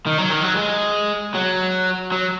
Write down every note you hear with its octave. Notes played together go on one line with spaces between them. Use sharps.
D#3
F#3
D#3
F#3
G#3
F#3
F#3